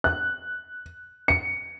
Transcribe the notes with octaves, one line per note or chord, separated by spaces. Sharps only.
F#6
C#7